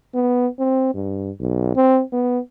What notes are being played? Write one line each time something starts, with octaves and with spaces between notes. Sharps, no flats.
B3
C4
G2
B1
C4
B3